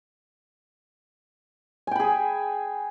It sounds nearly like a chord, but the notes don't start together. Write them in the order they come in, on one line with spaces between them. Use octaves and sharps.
G#5 G5 B5 G#4